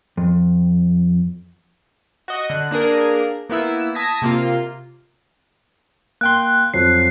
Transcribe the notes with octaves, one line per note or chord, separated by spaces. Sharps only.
F2
F#4 D#5
D3 F#6
A#3 D4 G#4 A#4
A#3 B3 E4 E6
A5 D#6 G#6 A#6 B6
C3 A#3 F4
A#3 G5 C6 F#6
F2 F3 F#3 C7